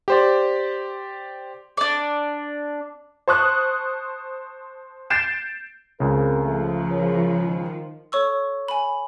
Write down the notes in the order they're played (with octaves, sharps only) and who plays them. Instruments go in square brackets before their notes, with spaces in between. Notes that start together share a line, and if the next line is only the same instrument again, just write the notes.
[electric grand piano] G4 C5 D5
[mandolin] D4 D5
[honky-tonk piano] C5 A5 C#6 D#6 F#6
G6 A6 C7 D7 E7
[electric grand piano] C#2 C#3 [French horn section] C4 A#4
[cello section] F3 [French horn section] A3
[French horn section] G#4 A#4 C#5
D#3
[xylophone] A4 C#5 C#6 E6
G#5 B5